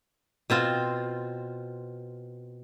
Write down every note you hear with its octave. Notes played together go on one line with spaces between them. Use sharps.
B2 C4 F4